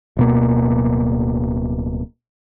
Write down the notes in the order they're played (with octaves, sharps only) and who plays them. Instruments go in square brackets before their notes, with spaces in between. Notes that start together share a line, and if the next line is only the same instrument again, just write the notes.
[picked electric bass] D1 B2 A#3